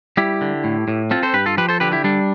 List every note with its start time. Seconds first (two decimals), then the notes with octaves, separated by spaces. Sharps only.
0.17 G3 E4 G4
0.41 D3
0.64 A2
0.88 A2
1.11 C4 F4 A4
1.23 A4 C5
1.34 G2 G4 B4
1.46 F4 A4
1.57 F3 G4 B4
1.69 A4 C5
1.80 D3 G4 B4
1.92 E4 G4
2.04 G3 D4